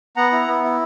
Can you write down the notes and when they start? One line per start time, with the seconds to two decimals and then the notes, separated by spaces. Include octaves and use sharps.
0.16 B3 F#5 A#5
0.32 E4
0.48 B3
0.63 E4